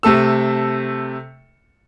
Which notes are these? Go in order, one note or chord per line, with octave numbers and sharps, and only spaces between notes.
C3 A3 A4 E6